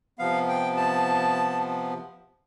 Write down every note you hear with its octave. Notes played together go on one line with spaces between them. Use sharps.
C3 F3 B3 F5
G5
A5